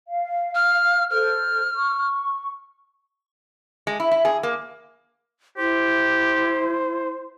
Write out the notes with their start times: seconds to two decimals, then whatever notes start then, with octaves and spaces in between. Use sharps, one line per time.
0.08 F5
0.55 F6
1.10 A4 C5 F6
1.74 C#6
3.87 G#3
4.00 E4
4.11 E4
4.25 G#4
4.43 A#3
5.58 E4 G4 C5